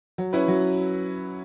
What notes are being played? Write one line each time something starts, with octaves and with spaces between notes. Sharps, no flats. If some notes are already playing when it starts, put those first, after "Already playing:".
F#3
C#4 E4 B4
F#3